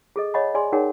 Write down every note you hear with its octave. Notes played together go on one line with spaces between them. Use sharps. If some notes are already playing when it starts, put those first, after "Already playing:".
G#4 A4 D#5
C#5 D#5 F#5 G#5 B5 C#6
G#4 D5 G#5 C6
D#4 G#4 A#4 C#5 F#5 G5